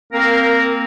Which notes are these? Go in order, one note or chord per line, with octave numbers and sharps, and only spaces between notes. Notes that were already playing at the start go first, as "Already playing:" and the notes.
A#3 C4 A#4